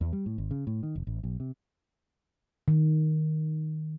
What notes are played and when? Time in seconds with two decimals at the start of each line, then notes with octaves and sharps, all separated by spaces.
0.01 E2
0.13 G3
0.26 A2
0.38 G#1
0.51 C#3
0.67 A2
0.83 D#3
0.96 F1
1.07 A1
1.23 B1
1.40 C3
2.68 D#3